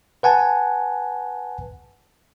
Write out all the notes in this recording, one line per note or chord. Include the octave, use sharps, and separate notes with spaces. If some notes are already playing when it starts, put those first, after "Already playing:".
B4 F#5 G#5 A5